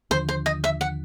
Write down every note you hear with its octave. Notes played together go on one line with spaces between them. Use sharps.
D#2 D3 F3 C5
C5
D#5
E5
F#5